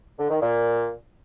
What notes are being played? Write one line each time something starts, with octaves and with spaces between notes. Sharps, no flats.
D3
D#3
A#2